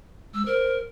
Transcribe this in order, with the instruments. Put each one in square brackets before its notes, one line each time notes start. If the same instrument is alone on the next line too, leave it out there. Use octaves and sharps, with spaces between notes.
[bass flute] G#3 [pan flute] E6
[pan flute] A#4 [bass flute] C5